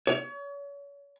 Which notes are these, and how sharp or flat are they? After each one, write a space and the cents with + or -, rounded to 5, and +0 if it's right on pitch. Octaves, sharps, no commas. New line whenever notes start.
C#5 +35